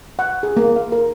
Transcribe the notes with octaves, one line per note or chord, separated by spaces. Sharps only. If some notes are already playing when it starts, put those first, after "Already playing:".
F#5
G#4
A#3
F5
A#4